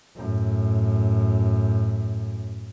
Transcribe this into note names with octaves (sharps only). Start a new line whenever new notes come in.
F#2 A2